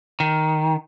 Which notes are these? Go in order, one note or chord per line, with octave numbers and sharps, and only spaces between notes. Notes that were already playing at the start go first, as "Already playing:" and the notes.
D#3